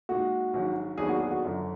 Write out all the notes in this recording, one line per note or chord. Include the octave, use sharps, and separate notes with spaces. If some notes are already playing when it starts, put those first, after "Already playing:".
A#2 G#3 D#4 F#4
A#1 G#2 D#3 F#3
D#2 D#3 F#3 B3 D4 G#4
F#4
G#4
F#4
F#1 F#2 D3 F3